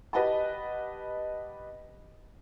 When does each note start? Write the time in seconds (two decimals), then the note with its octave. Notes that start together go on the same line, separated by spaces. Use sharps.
0.13 G4 B4 D#5 F#5 A5